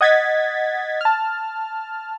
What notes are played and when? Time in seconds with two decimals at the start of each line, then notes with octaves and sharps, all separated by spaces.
0.01 D#5 F#5 G#6 A6 B6
1.01 A5 F6